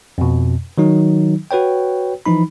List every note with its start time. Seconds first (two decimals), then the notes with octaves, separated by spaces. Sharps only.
0.18 F2 B2
0.78 D#3 F#3 D#4
1.51 F#4 B4 C#5 G5
2.26 E3 F3 D#4 B5